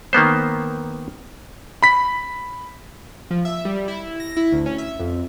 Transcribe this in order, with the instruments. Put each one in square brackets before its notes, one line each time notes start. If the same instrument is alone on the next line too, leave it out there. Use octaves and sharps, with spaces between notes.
[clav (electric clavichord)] D#3 A#3 B3 C5
[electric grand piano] B5 B6
[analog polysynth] F3
E5
G3
E4
A#6
E4
D2
C#4
E5
F2